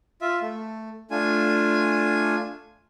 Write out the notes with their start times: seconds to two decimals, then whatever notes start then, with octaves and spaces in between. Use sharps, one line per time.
0.21 F4 E5
0.42 A3
1.11 A3 D4 F4 G#5